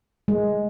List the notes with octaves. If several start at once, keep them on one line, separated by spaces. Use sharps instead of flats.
G#3